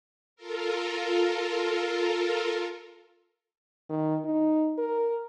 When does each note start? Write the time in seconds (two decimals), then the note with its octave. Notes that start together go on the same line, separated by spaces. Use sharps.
0.36 F4 A4 A#4
3.89 D#3
4.25 D#4
4.78 A#4